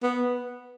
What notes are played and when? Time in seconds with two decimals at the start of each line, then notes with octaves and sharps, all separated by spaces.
0.03 B3